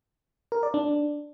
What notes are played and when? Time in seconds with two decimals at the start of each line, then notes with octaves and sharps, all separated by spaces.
0.52 A#4
0.63 D5
0.74 D4